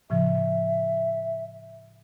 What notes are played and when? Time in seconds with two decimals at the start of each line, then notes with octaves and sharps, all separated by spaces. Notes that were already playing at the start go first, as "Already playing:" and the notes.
0.10 A2 C#3 F3 E5